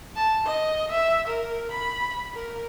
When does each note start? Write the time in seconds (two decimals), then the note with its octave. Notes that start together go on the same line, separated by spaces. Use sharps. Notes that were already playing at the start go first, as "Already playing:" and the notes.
0.16 A5
0.46 D#5
0.91 E5
1.27 A#4
1.71 B5
2.35 A#4